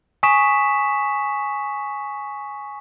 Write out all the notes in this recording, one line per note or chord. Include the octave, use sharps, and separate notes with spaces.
G#5 C#6 D#6 B6 E7